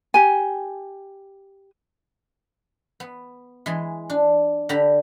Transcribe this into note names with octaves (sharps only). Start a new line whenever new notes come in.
G4 G#5
B3
E3 G#3 G#4
D4
D3 G4 A#5 B5